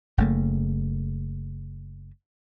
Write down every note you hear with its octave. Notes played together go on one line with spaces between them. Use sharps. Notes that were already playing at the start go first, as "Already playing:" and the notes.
F#1 C#3 A3 A#3